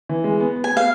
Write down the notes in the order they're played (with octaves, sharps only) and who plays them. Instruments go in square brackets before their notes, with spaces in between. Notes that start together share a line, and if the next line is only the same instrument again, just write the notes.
[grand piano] E3
G#3
B3
B3
[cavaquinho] G#5
[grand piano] B3 [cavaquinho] F5